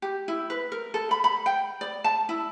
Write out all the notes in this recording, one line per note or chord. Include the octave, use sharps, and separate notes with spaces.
G4
E4
B4
A#4
A4
B5
B5
G5
D5
A5
E4